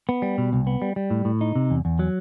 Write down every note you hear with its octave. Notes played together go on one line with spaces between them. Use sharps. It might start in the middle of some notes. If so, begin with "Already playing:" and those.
B3
G3
B2
C2
B3
G3
G3
A2
A2
D#4
C3
E2
E2
F#3